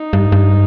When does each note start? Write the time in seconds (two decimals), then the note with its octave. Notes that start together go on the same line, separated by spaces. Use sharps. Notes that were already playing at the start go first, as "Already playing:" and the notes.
Already playing: D#4
0.13 G2
0.32 G2